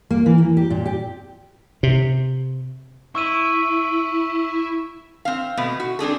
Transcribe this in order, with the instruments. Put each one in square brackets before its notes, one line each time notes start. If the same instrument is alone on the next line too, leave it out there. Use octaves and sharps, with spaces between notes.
[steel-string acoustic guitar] A#3
E3
A#3
G4
A#2
G4
[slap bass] C3
[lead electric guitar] E4 [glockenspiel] C#6 E6 D#7
[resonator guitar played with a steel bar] C4 F5
B2 A3 B3
F#4
C4 D4 G#4 A4